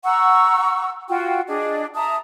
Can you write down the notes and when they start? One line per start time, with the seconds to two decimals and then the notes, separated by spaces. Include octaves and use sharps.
0.04 F#5 A#5 C#6 E6
1.09 F4 F#4 G5
1.48 D4 G#4 D#5
1.95 E5 A5 A#5 D#6